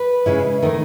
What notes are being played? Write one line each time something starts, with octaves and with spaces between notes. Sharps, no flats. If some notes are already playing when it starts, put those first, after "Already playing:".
Already playing: B4
C#3 G#3 C#4 E4
D#3 A3 D#4